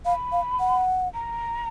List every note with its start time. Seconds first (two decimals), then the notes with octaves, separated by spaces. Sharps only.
0.05 F5 B5
0.32 F5
0.60 F#5
1.13 A#5